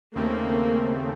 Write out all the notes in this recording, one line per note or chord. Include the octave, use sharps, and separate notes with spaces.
D#2 C#3 A3 A#3 C4